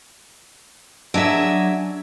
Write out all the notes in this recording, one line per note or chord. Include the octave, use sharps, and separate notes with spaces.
F#3 D4 G#4 E5